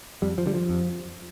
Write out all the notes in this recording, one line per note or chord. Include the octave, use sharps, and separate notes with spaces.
F2 G3
F3
D3 G3
F3
F2